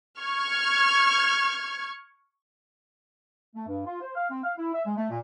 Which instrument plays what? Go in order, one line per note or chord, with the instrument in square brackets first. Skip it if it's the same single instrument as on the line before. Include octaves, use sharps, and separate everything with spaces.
[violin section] C#6 F6 G#6
[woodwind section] A3
G2
F4
C5
F5
C4
F5
E4
E5
G#3
A3
A#2